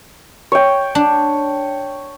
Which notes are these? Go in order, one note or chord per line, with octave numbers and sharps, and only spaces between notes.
C#5 G5
D4